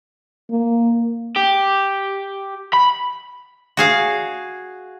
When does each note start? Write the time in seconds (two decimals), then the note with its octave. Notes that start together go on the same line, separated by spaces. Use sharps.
0.50 A#3
1.36 G4
2.73 B5
3.77 F#4 G#4 F5